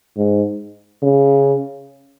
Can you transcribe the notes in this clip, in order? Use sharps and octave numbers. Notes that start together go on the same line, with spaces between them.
G#2
C#3